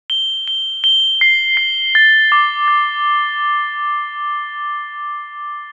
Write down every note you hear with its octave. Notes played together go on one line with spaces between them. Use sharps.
G7
G7
G7
C7
C7
A6
D6
A6